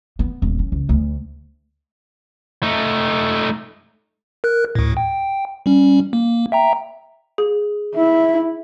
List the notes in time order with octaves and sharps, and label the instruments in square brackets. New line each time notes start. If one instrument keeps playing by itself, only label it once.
[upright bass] B3
D#1
C#4
C#2
D2
[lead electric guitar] A3 D#4
[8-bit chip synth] A#4 F#6
D2 A2
G5
G3 C#4
A#3
E5 G5 A#5
[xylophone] G#4
[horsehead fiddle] E4 [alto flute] E5